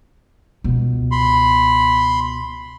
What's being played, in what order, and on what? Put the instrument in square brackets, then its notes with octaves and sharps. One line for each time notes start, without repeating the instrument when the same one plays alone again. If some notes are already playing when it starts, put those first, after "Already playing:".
[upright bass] C#2 B2
[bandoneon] B5 C6